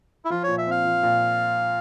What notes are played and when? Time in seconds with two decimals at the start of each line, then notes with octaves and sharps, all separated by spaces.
0.25 E4
0.30 F3 F4
0.43 A#2 C#5
0.58 E5
0.67 C4 F5
0.85 F3
1.03 A#2